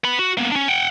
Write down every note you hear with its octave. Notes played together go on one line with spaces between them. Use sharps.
B3 B5
F#4
A#3 B3
C#4 D4
F#5 G5